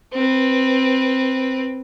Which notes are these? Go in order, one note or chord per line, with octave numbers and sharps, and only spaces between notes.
C4 B4